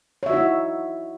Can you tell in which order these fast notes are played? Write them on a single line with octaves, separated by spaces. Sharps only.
C#5 E5 F#4 D#4 E4